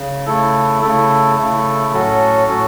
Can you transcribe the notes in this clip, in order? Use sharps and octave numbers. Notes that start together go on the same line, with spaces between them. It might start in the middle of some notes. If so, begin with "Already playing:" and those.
Already playing: C#3
C#3 A3 E4 A4
C#3 A3 E4 A4
C#3 A3 E4 A4
A2 F#3 C#4 F#4 A4
A2 F#3 C#4 F#4 A4